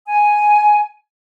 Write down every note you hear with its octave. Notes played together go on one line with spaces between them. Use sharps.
G#5